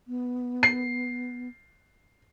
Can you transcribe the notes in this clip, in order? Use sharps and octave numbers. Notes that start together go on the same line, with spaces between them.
B3
C7